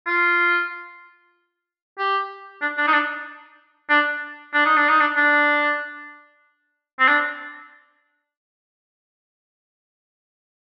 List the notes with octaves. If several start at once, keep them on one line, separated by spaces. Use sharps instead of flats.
F4
G4
D4
D4
D#4
D4
D4
D4
D#4
D4
D#4
D4
D4
C4
D4